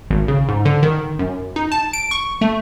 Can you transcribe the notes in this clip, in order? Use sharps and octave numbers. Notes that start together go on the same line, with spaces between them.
G#1
C#3
G#2
D3
D#3
F#2
D#4
A5
D7
C#6
A3